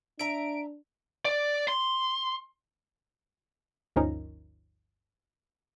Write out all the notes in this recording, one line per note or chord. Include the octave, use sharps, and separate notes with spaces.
D4 E5 A#5 D7
D5
C6
G1 D2 F3 C#4 D#4 A#4